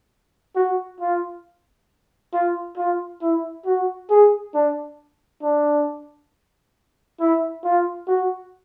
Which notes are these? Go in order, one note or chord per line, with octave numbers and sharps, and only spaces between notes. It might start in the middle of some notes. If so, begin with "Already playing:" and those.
F#4
F4
F4
F4
E4
F#4
G#4
D4
D4
E4
F4
F#4